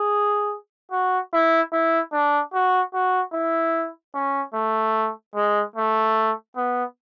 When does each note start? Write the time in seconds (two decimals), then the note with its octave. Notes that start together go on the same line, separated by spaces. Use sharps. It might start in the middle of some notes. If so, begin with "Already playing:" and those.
Already playing: G#4
0.92 F#4
1.33 E4
1.72 E4
2.13 D4
2.54 F#4
2.94 F#4
3.33 E4
4.14 C#4
4.54 A3
5.35 G#3
5.76 A3
6.56 B3